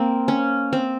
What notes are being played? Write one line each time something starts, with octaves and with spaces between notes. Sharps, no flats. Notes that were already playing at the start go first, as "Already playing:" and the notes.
Already playing: A#3 C4
C#4
C4